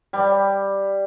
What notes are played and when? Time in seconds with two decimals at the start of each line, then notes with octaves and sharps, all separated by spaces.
0.13 G3